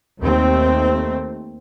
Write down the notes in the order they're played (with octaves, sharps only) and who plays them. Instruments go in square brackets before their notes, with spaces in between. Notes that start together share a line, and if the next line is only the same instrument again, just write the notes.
[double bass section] D#2 A3 C4